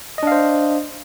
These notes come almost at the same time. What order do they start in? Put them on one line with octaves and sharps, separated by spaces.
D#5 D4 F5 C5